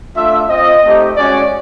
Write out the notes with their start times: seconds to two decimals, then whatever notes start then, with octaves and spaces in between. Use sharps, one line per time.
0.16 A3 D4 F4 E5
0.49 C4 F4 D#5
0.83 A3 C4 D#4 G4
1.17 G#3 C#4 F#4 D5